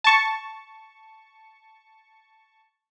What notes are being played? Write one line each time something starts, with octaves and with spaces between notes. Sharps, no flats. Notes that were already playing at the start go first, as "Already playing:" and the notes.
A5 C#6